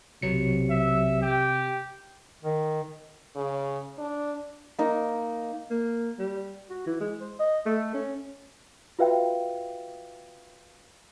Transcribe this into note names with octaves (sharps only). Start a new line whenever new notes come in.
B1 C3 F#3 C#7
E5
G4
D#3
C#3
D4
A#3 D#4
A#3
G3
F#4
E3
G#3
C5
D#5
A3
C#4
F4 F#4 B4 E5 F5 G5